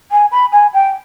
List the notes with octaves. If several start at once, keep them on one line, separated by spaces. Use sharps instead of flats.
G#5
B5
G#5
G5